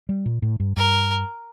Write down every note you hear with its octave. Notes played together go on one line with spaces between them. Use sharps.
G3
A#2
A2
G2
G2 A#4